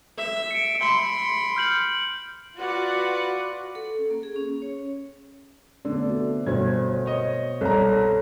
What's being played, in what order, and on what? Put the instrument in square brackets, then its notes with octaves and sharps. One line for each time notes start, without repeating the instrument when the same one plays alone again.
[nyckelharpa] E5
[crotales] C#7 D7
[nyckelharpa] B5 C6
[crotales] F6 G6 F#7
[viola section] F4 F#4 B4 D5 F#5
[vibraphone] A4
C#4
A#3
G#4
C#4
C#5
[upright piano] D3 [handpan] A3 B3 D5
[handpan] C4 F#4
[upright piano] G1 G#6 [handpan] B2 F#4 C5
[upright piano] C#5 D#5
[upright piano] C2 A#5 [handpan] A4 C#5